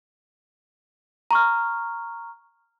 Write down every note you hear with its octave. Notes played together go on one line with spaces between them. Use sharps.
A#5 C#6 F6